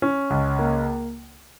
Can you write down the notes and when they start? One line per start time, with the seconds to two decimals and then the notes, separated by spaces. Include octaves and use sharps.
0.02 C#4
0.30 C#2
0.59 A#3